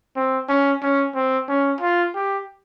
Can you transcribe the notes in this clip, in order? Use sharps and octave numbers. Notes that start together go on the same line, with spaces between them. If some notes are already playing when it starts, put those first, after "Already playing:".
C4
C#4
C#4
C4
C#4
F4
G4